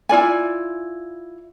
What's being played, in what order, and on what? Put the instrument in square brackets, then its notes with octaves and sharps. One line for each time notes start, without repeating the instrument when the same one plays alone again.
[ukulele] E4 F4 D5 G#5